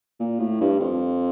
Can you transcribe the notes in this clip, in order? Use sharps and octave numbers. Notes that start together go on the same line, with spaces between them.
A#2
A2
G2
F2